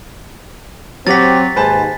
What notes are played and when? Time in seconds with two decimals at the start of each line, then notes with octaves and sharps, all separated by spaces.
1.07 F#3 C4 G4 F#5 A6 B6
1.56 D#2 G#2 B4 C5 G#5 A5